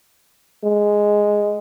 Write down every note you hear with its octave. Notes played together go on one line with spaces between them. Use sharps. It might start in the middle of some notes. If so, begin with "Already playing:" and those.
G#3